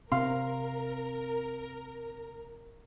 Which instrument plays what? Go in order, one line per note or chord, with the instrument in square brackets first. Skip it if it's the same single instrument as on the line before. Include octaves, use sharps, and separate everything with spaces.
[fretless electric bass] C3 C4 [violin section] A#4 [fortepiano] F5 C6